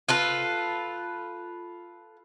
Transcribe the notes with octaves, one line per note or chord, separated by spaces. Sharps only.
F4 A4 B4